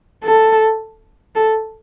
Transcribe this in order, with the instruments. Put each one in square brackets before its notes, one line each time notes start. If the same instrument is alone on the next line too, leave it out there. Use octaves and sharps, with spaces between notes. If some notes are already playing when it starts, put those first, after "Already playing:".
[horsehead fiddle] A4
A4